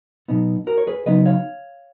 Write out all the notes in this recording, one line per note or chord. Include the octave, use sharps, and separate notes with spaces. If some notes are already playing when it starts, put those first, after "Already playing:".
B2 F#3 B3 D#4
F#4 A#4
C#5
G#4 B4
C#3 F#3 B3 D#4 B4 D#5
C#5 F5